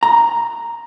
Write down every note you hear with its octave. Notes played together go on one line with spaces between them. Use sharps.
A#5